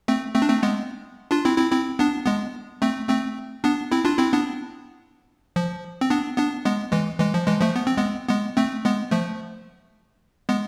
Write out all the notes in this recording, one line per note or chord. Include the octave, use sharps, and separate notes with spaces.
A3 C4
A3 C4
D4
A3 C4
G#3 B3
D4 F4
C4 E4
C4 E4
C4 E4
B3 D4
G#3 B3
A3 C4
A3 C4
B3 D4
C4 E4
D4 F4
C4 E4
B3 D4
F3
C4
B3 D4
B3 D4
G#3 B3
E3 G#3
E3 G#3
F3
E3 G#3
F3 A3
B3
C4
G#3 B3
G#3 B3
A3 C4
G#3 B3
F3 A3
G#3 B3